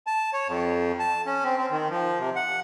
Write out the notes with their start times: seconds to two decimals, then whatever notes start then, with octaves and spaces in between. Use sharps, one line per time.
0.07 A5
0.33 C#5
0.48 F2
0.99 A5
1.26 C#4
1.44 C4
1.58 C4
1.71 D#3
1.90 F3
2.19 C3
2.36 F#5